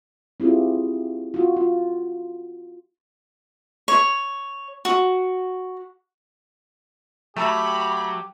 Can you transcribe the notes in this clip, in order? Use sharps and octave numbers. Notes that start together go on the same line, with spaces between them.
C4 E4 F4 G4 G#4
F4 F#4
F4
C#5
F#4
F#3 A3 G4 B5